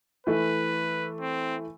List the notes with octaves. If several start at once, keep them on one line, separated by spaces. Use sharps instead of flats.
E3 A3 B4
C4